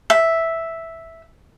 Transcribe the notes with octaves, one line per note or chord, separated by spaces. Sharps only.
E5